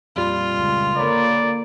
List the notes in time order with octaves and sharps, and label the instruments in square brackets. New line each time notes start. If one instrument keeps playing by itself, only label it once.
[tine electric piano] F2 A#2 G3 [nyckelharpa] F4
[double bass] C#2
[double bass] D3 A#3 [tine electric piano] A#4 C#5 B5 [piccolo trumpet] D5